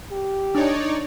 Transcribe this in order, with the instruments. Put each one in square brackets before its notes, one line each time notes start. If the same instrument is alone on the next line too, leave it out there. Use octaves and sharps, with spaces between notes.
[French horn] G4
[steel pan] D4 [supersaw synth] D#4 C#5 D5